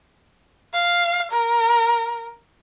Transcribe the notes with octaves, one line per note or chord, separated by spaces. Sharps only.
F5
A#4